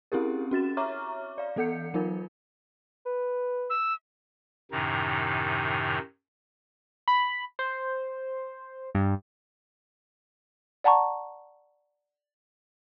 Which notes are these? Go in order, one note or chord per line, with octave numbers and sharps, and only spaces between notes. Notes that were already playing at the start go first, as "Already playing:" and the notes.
C4 C#4 E4 G4 G#4 A#4
C#4 F#4 A6 E7
C#5 E5 A#5 C#6 D6 F6
D5 F5
E3 B3 A4 F#5 G6 C#7
F#3 D#4 F4 A#4
B4
E6
F#2 A2 C3 D#3 D#4
B5
C5
G2
D5 F#5 A5 A#5 C#6